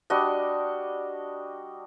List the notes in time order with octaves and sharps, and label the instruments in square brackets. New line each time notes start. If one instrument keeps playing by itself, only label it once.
[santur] G3 D4 F#4 D#5